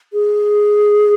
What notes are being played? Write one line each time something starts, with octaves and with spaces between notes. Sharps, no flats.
G#4